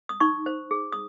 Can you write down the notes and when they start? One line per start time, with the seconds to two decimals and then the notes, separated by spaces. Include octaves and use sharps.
0.09 D#6
0.20 D#4 C#6
0.46 C5
0.71 G#4
0.92 D#6